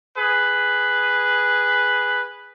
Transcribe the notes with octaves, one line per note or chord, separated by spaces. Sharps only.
G#4 B4